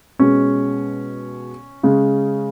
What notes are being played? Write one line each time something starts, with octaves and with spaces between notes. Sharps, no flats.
B2 G#3 C#4
C#3 G#3